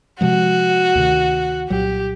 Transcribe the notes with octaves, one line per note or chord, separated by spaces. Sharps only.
C3 F3 G#3 F#4
D2 C3 D#3
C2 A#2 F#3 G4